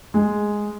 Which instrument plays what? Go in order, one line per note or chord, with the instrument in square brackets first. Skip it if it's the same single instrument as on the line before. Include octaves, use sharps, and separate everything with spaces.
[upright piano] G#3